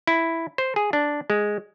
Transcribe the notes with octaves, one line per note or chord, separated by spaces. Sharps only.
E4
C5
G#4
D4
G#3